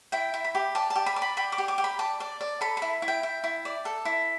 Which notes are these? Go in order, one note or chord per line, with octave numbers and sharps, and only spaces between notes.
E4 G5
E4
B5
G4
D5 A5
A5
G4
B5
D5
B5
G4 B5
D6
G4
D6
G4
B5
D5 A5
D5
D5
A4 B5
E4 B5
E4
G5
E4
E4
D5
A4
E4